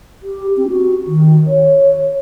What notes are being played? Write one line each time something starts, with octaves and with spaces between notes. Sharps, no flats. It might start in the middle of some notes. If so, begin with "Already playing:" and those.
G4
C4
F#4
D#3
C#5